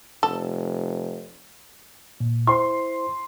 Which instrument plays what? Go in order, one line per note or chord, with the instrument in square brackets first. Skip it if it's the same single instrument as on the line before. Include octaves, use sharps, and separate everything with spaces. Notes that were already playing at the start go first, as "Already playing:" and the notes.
[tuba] F1 [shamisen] A4
[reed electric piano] A#2
[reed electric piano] E4 C5 [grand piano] C6